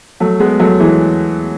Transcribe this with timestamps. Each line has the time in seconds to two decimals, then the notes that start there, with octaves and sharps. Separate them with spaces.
0.20 F#3 A3
0.40 G#3 B3
0.60 F#3 A3
0.80 E3 G#3